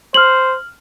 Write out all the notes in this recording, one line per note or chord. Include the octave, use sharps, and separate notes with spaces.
C5 F6 F#7